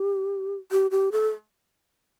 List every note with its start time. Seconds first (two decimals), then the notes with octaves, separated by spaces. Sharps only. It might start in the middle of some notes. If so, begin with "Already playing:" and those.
Already playing: G4
0.72 G4
0.91 G4
1.12 A4